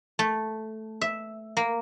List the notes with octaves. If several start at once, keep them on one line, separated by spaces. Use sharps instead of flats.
A3
E5
A#3